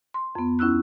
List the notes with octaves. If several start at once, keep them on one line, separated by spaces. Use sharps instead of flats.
C6
F2 B3
D2 C#4 E4 E6 F#6